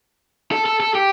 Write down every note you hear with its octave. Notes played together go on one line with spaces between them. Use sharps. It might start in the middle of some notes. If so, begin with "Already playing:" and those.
A4
A4
A4
G4